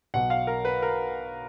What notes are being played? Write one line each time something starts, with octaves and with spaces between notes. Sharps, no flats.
B1 B2 F#3 F#5
F5
A#4
B4
A#4